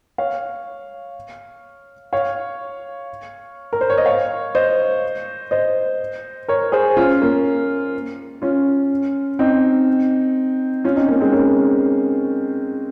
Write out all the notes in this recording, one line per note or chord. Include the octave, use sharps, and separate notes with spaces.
C#5 F5
C#5 F5
A#4
C5
C#5
D#5
C#5 F5
C5 D#5
C5 D#5
A#4 C#5
G#4 C5
C#4 F4
A#3 C#4
C#4 F4
C4 D#4
C#4 F4
C4 D#4
A#3 C#4
G#3 C4
A#3 C#4